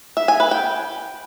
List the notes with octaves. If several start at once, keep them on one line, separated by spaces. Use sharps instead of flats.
E5
G#5
B4
G5